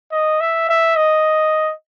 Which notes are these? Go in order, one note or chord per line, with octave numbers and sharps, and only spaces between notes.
D#5
E5
E5
D#5